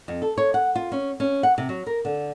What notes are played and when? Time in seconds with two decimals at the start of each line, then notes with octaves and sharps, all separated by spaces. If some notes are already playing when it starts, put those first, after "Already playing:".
0.08 F2
0.22 A4
0.38 C#5
0.54 F#5
0.75 F4
0.92 C#4
1.20 C#4
1.43 F#5
1.58 C3
1.69 F#3
1.87 A#4
2.05 D3